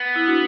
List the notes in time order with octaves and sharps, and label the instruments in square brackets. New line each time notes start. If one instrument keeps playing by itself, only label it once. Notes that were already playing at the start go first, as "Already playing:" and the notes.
Already playing: [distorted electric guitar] B3
[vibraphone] E4
D4 F#4